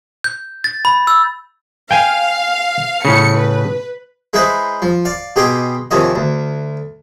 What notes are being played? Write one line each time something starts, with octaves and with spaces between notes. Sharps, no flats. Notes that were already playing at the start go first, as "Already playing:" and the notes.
G6
A6
B5
E6
F5 G5 G#5
A2 C#3 C#7
B4
G#3 D#4 E4 B4 C5 D#5
F3
D5 F5
B2 G4 G#4 D#5 C6 D6
D#2 C3 F3 C#4 D#5
D2